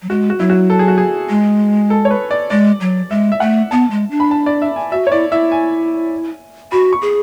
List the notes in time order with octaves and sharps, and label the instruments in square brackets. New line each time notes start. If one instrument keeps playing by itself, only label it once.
[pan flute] F#3
[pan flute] G#3 [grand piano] F#4
[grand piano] F#4
[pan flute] F#3 [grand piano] E4
[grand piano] F#4
A4
G#4
F#4
G#4
[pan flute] G#3
[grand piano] A4
C#5
B4
D5
[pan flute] G#3 [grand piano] D5
[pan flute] F#3
[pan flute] G#3 [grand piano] E5
[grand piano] E5
[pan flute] A3 [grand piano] F#5
[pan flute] B3 [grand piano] A5
[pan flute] G#3
D4
[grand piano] B5
A5
D5
E5
G#5
[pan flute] F#4 [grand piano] E5
[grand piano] C#5
[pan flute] E4 [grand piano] D5
[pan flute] E4 [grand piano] E5
[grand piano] G#5
[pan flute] F#4 [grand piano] B5
[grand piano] C#6
[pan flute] G#4